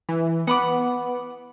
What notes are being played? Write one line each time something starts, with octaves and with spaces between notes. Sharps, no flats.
E3
B3 F#5 B5 D6